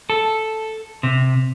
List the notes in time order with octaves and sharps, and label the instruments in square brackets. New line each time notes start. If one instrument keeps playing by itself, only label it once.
[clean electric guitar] A4
C3